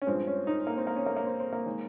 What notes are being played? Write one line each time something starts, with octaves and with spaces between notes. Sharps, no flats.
C#4
G2 F3 G#3 C4
C#4
D#4
A#3
C4
A#3
C#4
A#3
A#3
C4
C4
A#3
D#3 G#3